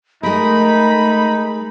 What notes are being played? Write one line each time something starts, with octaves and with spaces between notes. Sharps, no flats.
G#3 A3 D#4 A#4 B5